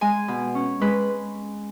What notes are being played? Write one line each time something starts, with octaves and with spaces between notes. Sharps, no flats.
G#3 G#5
B2
C#4
G#3 B4